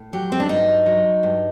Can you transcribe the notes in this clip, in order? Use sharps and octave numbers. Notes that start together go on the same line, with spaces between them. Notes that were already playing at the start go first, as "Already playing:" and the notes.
Already playing: A2
F#3 G4
C4
D4
G2 D#4
F#3
G2